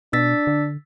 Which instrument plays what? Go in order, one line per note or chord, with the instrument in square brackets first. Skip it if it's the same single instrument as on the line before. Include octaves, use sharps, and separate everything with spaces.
[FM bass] B2 [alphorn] D4 [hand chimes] E6 A6 B6
[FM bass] D3